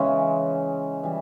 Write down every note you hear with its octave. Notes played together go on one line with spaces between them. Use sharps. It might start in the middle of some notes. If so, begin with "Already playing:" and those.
Already playing: C#3 E3 G#3 C#4
E3 G3